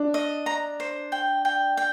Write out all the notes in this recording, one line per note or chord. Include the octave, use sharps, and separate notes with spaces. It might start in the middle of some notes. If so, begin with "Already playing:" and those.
Already playing: D4
D#5
A#5
C5
G5
G5
G5